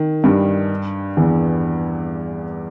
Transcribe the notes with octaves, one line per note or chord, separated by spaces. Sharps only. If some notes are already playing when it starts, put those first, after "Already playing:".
Already playing: D#3
G2 G3
E2 E3